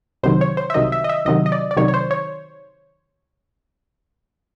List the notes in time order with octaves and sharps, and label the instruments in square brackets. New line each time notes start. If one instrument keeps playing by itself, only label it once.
[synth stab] C2 C3 D#3 F#3 C5
C#5
C5
E5
C2 C3 D#3 F#3 D#5
E5
D#5
E5
C2 C3 D#3 F#3 D#5
D#5
D5
D5
C2 C3 D#3 F#3 C#5
C#5
C5
C#5